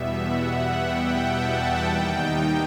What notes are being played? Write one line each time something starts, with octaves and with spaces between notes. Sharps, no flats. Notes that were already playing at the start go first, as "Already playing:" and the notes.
Already playing: E2 B2 G3 B3 E5
F#5
G5
A5
D#2 D#3 G3 D#4 G5